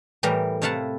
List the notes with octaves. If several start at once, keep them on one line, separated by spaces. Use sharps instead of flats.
A2 E3 G3 G4 A#4
C3 A3 E4 F5 F#5 A5